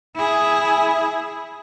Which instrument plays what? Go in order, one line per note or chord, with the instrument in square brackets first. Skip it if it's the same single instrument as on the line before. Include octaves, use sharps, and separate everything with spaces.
[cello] E4 G#4